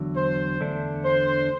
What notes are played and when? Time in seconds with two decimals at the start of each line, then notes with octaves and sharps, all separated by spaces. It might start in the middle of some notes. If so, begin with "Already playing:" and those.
Already playing: E2 D3 F#3
0.16 C5
0.60 E2 D3 A3 D4
1.04 C5